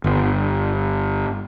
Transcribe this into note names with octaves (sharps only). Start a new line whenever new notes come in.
G1